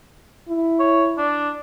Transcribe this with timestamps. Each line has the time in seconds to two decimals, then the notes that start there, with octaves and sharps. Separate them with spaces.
0.49 E4
0.79 C#5
1.18 D4